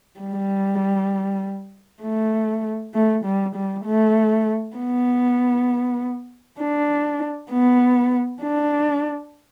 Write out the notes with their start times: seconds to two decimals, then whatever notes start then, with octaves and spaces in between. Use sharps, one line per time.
0.20 G3
2.03 A3
2.94 A3
3.25 G3
3.55 G3
3.85 A3
4.77 B3
6.60 D4
7.51 B3
8.42 D4